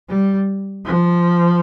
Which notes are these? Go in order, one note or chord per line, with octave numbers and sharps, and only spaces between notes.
G3
F3